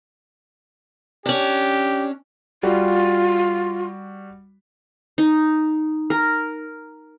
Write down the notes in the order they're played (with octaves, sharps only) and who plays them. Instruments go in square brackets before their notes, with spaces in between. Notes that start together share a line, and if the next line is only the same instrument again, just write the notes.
[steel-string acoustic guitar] C#4 D4 [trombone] G4
[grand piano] G3 F#4 [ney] F4
[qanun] D#4
A#4